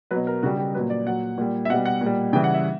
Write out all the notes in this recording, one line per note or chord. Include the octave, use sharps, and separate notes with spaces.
B2 F#3 B4
A#4
C#3 G3 F#4
G4
A#2 F#3 B4
D5
A#2 F#3 F#5
A#2 G3
E5
B2 G3 F#5
F#5
A#2
G3
C#3 E3 G3 G5
F#5
E5